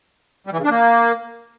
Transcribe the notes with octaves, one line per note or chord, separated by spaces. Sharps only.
G3
E3
C#3
D4
A#3